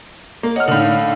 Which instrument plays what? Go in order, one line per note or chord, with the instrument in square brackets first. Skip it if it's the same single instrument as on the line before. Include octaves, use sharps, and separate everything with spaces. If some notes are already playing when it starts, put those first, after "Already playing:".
[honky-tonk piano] A#3
[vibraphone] C#5 F#5 [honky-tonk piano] D#5 F6
[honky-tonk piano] A2 D3 [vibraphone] D#4 F5